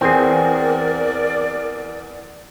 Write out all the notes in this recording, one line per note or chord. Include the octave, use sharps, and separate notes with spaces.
E2 C4 G#4 A#4 D5